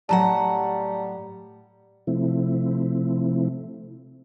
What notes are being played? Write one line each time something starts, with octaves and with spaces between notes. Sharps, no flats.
A2 F#3 G3 F#5 A5 A#5
C3 F3 A3 C4 E4